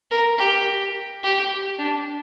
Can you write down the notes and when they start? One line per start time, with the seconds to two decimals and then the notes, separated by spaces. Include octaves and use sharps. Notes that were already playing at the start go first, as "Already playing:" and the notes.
0.11 A#4
0.38 G4
1.23 G4
1.79 D4